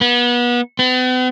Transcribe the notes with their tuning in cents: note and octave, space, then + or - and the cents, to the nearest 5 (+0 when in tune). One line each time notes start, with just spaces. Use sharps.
B3 -30
B3 +45